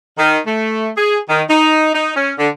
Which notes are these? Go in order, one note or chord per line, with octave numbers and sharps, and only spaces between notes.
D#3
A3
G#4
D#3
D#4
D#4
C#4
D3